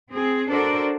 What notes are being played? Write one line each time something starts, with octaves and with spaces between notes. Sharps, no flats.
C4 G#4
D4 F#4 A4 A#4 C5 D5